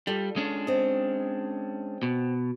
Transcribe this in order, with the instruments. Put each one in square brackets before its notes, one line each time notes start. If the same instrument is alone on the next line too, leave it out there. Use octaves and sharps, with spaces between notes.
[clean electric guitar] G3 [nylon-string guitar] F4 A4
[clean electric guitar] G#3 C#4 D4
[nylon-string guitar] C4 D#5
[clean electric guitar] B2